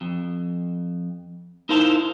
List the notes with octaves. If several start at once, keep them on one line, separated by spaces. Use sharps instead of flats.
F2
D#4 E4 A#4 C5 F5 A5